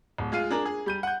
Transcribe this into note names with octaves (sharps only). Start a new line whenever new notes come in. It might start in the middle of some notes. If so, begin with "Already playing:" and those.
D1
G#3 F4 F5 D#7
D4 G#4 A#4
G#4
G3 G6 D#7
F#5 G6